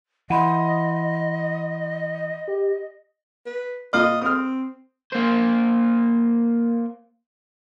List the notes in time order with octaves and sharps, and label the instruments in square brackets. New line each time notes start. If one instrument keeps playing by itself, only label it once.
[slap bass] E3 [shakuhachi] D#5 [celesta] F#5 B5 C6
[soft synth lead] G4
[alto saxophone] B4
[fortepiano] A#2 F5 F6 [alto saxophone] D#5
[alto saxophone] C4 [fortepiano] D#6 F6
[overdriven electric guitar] A#3 C5